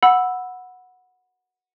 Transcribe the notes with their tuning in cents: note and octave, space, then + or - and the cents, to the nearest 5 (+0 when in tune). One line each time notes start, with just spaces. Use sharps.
F#5 -10 B5 +0 E6 +0